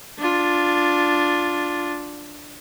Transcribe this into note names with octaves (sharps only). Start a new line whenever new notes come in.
D4 F4